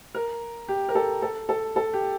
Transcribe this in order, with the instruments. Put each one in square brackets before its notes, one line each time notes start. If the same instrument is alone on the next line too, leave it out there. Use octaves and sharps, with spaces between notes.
[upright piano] A#4
G4
A#4
A4
A4
A4
A4
G4